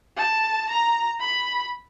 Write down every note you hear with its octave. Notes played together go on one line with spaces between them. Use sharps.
A5
A#5
B5